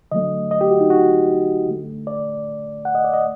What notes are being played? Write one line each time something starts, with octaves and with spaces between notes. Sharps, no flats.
D3 F#3 A3 D#5
D#5
G4
F#4
D#4
F#4
D3 A3
D5
F#5
D#5
D5
D#5